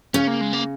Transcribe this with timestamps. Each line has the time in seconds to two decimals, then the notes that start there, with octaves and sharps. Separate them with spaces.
0.14 C#3 C#4
0.27 A#3
0.41 G#3
0.53 A#3